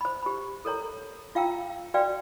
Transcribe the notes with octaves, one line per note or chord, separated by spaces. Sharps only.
C5 B5
G4 B5
A4 A#4 C#5 A#5
F4 F5 G5 A#5 E6
F#4 B4 D5 F5 G5